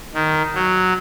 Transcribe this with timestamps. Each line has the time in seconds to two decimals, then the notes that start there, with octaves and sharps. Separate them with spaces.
0.14 D#3
0.55 F#3